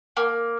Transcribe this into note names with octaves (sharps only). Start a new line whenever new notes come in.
A#3